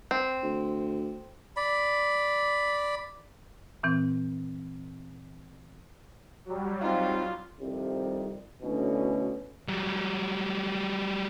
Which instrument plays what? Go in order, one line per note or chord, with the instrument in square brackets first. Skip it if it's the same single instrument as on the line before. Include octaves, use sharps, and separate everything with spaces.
[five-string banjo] C4
[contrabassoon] D2
[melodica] D5 B5
[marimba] A#2 E3 C4
[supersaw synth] F#3 G3
[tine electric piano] C4 D#4 F5 [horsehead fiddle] F4
[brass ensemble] C2 F2 C3 D#3 G3
D2 B2 D3 E3 C#4
[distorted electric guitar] F#3 G3